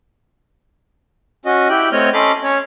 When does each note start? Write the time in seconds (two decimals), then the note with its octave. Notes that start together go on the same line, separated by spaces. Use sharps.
1.46 C#4 F#4 D#5
1.69 E4 G4 G5 F#6
1.92 A3 C4 C#5 D#5 F6 G6
2.14 C#4 A4 D#5 B5 C6 D6
2.43 C#4 C#5